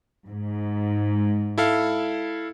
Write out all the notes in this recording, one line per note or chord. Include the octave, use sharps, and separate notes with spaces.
G#2
E4 A4 F5